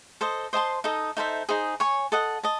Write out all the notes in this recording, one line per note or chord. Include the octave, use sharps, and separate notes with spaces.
A4 C5 D#5
C5 D#5 A5 C6
D#4 A4 D#5
D#4 A4 C5 E5
D#4 G#4 C5
C#5 G#5 C#6
A4 D#5 F#5
D#5 A5